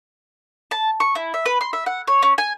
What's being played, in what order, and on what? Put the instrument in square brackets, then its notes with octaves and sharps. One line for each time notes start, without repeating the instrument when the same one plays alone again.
[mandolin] A5
C#6
E4
E5
B4
C6
E5
F#5
C#5
C#4
G#5